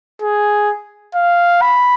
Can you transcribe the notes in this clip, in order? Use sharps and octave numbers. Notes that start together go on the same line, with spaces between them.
G#4
F5
B5